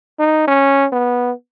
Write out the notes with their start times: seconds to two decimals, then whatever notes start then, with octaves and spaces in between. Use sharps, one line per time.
0.19 D#4
0.47 C#4
0.92 B3